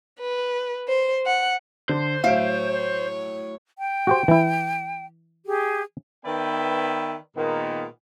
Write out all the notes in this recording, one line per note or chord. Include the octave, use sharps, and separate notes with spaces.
B4
C5
F#5
D3 C5
A2 F#3 C#5 E5 F5 D7
G5
F#4 G4 C5
E3 E4
G4 G#4
D#3 B3 B4 D5 E5 G5
A#2 D#3 G#3 A#3 B3